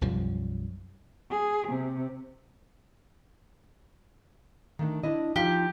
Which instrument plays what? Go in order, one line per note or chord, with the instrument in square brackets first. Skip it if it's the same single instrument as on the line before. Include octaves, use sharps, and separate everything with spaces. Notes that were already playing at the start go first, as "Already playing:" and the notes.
[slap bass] B1 F#2 F3 G3
[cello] G#4
C3
[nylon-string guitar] D#3 A3 D4
D4 E4 D#5
[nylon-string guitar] F3 D#4 F4 [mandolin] G4